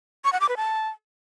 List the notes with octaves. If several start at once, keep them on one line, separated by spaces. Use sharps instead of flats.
C#6
F#5
D6
B4
A5